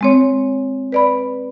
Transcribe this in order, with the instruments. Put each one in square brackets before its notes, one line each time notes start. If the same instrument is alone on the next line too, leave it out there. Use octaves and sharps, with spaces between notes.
[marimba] G#3 C4 C#5
B4 D5 B5